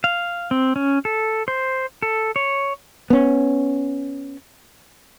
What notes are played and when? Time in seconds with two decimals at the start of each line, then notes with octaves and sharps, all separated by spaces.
0.04 F5
0.51 C4
0.76 C#4
1.05 A4
1.48 C5
2.02 A4
2.36 C#5
3.10 B3 C#4